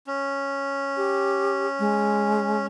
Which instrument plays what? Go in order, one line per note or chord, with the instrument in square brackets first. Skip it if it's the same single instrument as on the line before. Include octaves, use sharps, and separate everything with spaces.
[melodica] C#4
[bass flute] G4
G#3